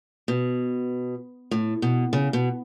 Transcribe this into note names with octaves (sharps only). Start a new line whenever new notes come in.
B2
A2
B2
C#3
B2